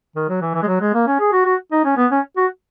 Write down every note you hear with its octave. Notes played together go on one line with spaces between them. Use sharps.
D#3
F#3
E3
E3
G#3
F#3
G#3
A#3
C#4
G#4
F#4
F#4
D#4
C#4
B3
C#4
F#4